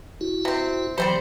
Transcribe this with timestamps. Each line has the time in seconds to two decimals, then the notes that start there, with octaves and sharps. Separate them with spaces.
0.21 E4 F#4
0.45 C3 C4
0.98 E3 F#3 G3 C4 G4 C5